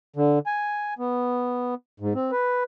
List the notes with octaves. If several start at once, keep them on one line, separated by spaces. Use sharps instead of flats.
D3
G#5
B3
G#2
C4
B4